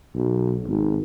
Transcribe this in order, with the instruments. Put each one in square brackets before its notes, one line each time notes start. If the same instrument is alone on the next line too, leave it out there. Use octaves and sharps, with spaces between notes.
[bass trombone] B1
G#1